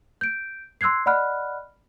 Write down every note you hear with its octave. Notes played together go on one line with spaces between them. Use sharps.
G6 D7
C6 E6 F#6 G#6 C7
D5 D#5 F#5 B5 F6 F#6